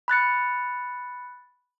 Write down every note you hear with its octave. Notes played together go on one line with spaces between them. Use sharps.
B5 F#6 A6 C#7